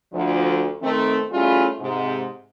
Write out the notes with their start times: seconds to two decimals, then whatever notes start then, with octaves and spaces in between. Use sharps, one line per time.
0.13 D2 F3
0.82 D#3 A3 C4
1.31 G3 A3 C#4 E4 F4 G#4
1.80 G#2 C3